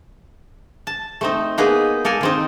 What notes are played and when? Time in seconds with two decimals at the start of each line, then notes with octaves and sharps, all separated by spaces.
0.87 A5
1.21 A3 C4 D#4
1.58 A#3 B3 D#4 G#4 B4
2.05 A#3 A4 A#4 G#5
2.21 D#3 C4 D#4